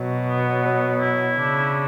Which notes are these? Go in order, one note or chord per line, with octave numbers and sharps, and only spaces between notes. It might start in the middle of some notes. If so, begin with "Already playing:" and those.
Already playing: B2 F#3
B3
F#3
E4
C#3 D4